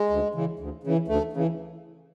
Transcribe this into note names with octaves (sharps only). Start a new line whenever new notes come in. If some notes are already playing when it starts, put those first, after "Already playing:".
Already playing: G#3
D2
C#3 E3
D2
C#3 E3
D2 A3
C#3 E3